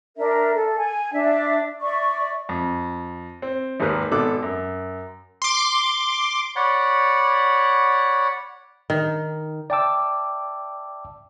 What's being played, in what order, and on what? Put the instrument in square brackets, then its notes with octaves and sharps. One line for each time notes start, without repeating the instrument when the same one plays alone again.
[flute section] D4 A#4 E5
A4
G#5
D4 D5 E5
D5 E5 C#6
[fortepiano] F2
C4
G#1 D#2 G4 A#4 B4
G#1 B2 A4 D6 F#6
F#2
[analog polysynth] C6 D6
[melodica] C#5 D5 F#5 B5
[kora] D#3
[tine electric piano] D5 E5 G5 A5 D6 E6